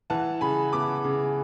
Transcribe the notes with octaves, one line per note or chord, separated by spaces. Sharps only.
E3 F#5 A5
C#3 G#5 B5
B3 B5 D6
C#3